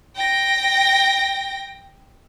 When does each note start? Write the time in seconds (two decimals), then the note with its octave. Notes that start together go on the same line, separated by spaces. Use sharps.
0.16 G5 A#6